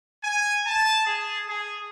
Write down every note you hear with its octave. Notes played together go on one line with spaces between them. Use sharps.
G#5
A5
G#4
G#4